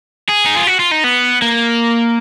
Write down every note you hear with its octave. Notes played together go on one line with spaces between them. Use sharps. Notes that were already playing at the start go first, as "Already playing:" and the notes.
G#4
D#4
F4
F#4
F4
D#4
B3
A#3